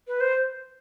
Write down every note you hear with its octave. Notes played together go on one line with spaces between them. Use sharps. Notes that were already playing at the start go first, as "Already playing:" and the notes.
B4
C5